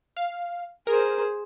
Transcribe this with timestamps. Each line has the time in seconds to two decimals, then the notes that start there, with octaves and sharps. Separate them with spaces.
0.17 F5
0.87 G#4 A#4 C5